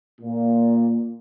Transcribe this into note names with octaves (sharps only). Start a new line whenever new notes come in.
A#2